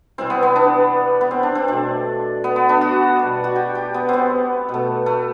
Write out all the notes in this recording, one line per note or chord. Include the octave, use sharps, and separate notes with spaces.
C3 E3 G3 C4
B3
B3
D4
B3
C4
D4
C4
B2 A3 D4
B3
B3
D4
F#4
B2 G3
F#4
G4
G4
B3
B3 C4
B2
A3
A3